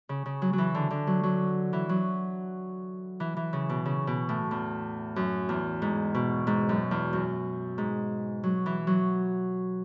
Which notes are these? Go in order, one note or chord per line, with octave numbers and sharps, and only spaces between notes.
C#3
C#3
F#3
F#3
E3
D3
D3
F#3
F#3
E3
F#3
E3
E3
C#3
B2
C#3
B2
A2
E2
F#2
E2
G#2
B2
G#2
F#2
E2
F#2
G#2
F#3
E3
F#3